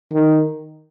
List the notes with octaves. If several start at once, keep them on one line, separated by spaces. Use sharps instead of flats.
D#3